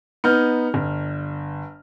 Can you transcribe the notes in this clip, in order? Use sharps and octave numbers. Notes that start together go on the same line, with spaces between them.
B3 D#4 F6 G6
G1